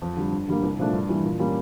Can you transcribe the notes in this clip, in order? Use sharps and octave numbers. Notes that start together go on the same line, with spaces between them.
F2
D3 G3
G2
D3 G3 A#3
C2
A#2 F3 A3 D4
G2
E3 G3 A#3
A#2
G3 A#3 C#4